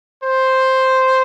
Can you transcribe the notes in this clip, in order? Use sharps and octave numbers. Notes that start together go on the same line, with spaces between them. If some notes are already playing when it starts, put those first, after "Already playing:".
C5